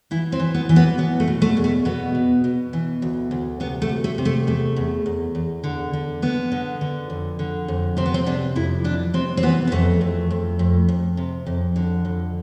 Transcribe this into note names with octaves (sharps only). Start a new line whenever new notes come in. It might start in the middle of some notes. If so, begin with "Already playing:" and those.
E3 E4
C4
E3
B3
E3
B3
B2 B3
A3
B2
A3
E2
A3
B2 B3
B2
B2
E3
D2
D2
C3 B3
A3
D2
A3
C3
A3
E2 A3
E2
E2
E2
D3
D3
D3 B3
D3
D3
F2
D3
F2
C3 C4
B3
C4
C3 D4
F2 E4
E3 D4
C3 C4
C4
E3 B3
B3
F2 A3
F2
F2
F2
F2
C3
F2
D3
F2